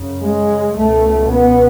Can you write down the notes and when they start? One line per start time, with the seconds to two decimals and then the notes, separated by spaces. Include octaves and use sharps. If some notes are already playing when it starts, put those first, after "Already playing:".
Already playing: F#2 C#3
0.22 G#3
0.75 C#2 B2 A3
1.30 B3